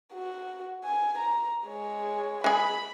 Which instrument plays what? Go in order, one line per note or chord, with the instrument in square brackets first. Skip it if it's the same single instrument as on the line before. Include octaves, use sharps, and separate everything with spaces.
[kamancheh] F#4
G#5
A#5
G#3 C#5
[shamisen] G#3 G#4 [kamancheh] B5